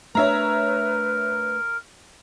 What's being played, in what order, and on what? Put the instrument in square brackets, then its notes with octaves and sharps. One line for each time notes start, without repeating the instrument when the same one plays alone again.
[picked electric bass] A3 D4 [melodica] A#4 [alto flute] B4 [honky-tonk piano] C#5 E5 A#5